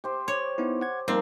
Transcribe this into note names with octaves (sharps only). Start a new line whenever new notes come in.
G4 C5
C#5 D6
B3 D#4 E4
F#5 G#6
F3 G3 A#3 C4 D#4 A#4